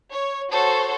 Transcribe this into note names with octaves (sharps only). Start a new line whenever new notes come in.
C#5
F#4 A4 C5 C#5